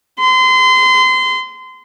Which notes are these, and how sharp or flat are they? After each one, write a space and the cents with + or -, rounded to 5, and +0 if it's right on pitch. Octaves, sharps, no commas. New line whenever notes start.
C6 -30